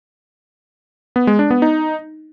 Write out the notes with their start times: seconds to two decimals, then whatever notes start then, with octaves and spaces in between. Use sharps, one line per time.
1.16 B3
1.27 G#3
1.39 D4
1.51 B3
1.62 D#4